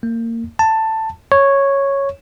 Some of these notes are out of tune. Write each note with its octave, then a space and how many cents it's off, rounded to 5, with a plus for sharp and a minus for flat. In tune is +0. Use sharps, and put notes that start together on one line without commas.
A#3 -25
A5 +10
C#5 -5